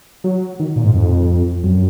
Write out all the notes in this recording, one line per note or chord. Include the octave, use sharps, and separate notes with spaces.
F#3
D#3
A#2
G#2
F2
F#2